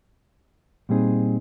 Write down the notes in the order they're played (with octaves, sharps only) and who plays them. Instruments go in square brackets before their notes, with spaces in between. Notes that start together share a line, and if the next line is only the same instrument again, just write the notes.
[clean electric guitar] A#2 G3 C4 D#4 G#4